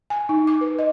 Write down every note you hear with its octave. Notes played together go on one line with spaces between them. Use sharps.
G#5
D#4
D6
B4
D#5